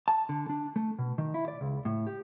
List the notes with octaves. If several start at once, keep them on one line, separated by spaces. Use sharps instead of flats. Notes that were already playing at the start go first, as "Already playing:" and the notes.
A5
D3
D4
A3
B2
D#3
E4
D5
C#2
A2
G4